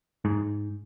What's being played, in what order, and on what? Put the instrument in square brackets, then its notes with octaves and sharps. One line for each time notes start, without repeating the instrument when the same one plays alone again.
[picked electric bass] G#2